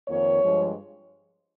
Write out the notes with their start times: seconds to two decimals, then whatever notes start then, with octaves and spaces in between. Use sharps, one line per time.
0.08 F2 D#3 A#3 C#5
0.41 G2 F3 G#3